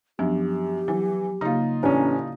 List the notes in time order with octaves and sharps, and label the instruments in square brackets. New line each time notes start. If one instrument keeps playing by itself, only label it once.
[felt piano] F#2 [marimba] F3 B3 D4 [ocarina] G4
[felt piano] E3 [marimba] F#3
[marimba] C#3 A#3 [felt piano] D#4 F4
[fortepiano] A1 C#4 [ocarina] D4 [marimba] D5